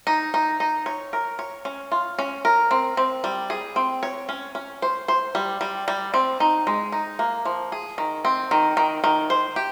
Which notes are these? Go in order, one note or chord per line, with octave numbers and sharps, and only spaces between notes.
D#4
D#4
D#4
C#5
A#4
C#5
C#4
F4
C#4
A#4
C4
C4
G3
G#4
C4
C#5
C#4
C#4
C5
C5
G3
G3
G3
C4
D#4
G#3
D#4
A#3
F3
G#4
D#3
C4
D#3
D#3
D#3
C5
G4